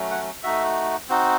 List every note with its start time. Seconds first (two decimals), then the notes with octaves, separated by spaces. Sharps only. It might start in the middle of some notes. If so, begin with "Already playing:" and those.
Already playing: F#3 A3 C#4
0.11 F#5
0.43 A3 D#4 F#4 E5
1.09 C4 D#4 F#4